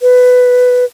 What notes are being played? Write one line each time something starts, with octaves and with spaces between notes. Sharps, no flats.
B4